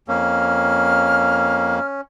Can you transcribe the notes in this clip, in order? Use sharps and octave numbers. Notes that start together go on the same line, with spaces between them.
F2 A#3 C#4 F6